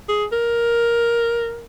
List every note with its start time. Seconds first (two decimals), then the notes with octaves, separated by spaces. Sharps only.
0.09 G#4
0.32 A#4